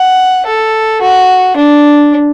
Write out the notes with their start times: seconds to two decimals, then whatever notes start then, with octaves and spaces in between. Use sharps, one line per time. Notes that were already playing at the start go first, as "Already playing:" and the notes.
Already playing: F#5
0.46 A4
1.02 F#4
1.57 D4